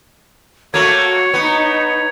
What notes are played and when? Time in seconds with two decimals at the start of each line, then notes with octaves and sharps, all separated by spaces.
0.74 A3 A#3 F#4 C#5 G#6 F7
1.34 B3 D#4